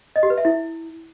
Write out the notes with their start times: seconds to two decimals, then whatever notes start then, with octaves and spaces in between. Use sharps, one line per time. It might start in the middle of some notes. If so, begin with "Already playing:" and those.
0.16 D#5
0.23 G4
0.30 B4
0.38 E5
0.45 E4